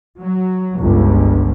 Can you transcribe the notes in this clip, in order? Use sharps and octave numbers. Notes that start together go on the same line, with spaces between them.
F#3
G1 C#2